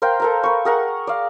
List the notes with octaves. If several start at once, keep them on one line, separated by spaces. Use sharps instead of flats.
A#4 C5 F5 G5
A4 A#4 A#5
B4 C#6
G#4 A#4 F#5
D5 F5